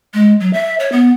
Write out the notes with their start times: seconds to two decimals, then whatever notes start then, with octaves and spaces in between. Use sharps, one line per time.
0.14 G#3
0.40 F#3
0.53 E5
0.80 C#5
0.92 B3